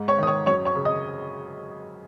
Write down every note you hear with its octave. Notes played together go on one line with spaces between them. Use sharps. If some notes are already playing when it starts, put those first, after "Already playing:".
Already playing: G#2
C#5 C#6
D#3 D#6
C#5 C#6
F#2 C#5 C#6
C#5 C#6
C#3
D#5 D#6